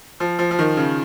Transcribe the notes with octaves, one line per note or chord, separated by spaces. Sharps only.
F3
F3
F3
D#3
C#3